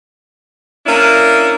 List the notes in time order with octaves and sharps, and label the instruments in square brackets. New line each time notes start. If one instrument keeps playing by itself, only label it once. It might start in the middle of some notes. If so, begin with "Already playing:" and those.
[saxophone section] A#3 C#4 D4 E4